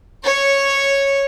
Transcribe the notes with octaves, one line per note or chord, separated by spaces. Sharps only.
C#5